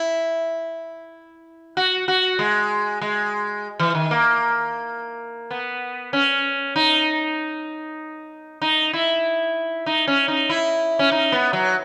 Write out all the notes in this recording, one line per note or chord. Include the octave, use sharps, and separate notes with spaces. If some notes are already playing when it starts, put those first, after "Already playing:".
Already playing: E4
F#4
F#4
G#3
G#3
E3
D#3
A#3
B3
C#4
D#4
D#4
E4
D#4
C#4
D#4
E4
C#4
D#4
B3
F#3